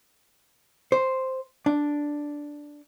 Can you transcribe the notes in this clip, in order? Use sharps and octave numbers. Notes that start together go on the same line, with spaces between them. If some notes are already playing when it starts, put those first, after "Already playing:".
C5
D4